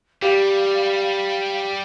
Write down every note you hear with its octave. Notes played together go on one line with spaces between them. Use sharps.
G3 G4 F5